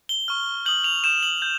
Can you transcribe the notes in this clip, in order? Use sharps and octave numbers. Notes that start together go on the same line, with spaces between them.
G7
C#6 F6
D#6 G6 F#7
F7
C#6 E6 G6 E7
F#7
G6